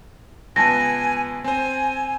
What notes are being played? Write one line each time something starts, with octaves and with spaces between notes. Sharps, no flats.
C#2 B3 G#5 A5 A#6
C4 C5 G#5